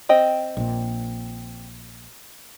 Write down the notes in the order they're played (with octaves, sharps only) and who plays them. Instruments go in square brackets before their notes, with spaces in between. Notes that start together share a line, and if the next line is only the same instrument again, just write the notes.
[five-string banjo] C4 D#5 G5
[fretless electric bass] A#1 A#2